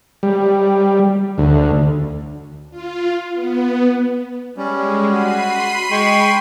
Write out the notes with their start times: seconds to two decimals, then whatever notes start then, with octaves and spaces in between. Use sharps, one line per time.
0.23 G3
1.38 D2
2.71 F4
3.33 B3
4.57 G3 G#3 C#4
5.07 F#4 B5 C7 D#7
5.59 C6
5.91 G#3 G5 C6 C#6